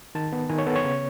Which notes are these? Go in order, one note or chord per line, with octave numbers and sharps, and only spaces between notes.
D#3 A5
B3
D#3 G#5
C#5
B3 A4
C#5
C#3